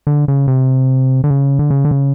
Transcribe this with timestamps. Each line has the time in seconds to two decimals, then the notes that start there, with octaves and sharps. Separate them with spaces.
0.07 D3
0.28 C#3
0.48 C3
1.24 D3
1.31 C#3
1.59 D3
1.70 C#3
1.85 D3
1.91 C#3